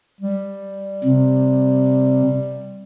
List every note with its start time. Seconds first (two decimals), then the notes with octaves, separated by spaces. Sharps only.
0.21 G3
1.04 C3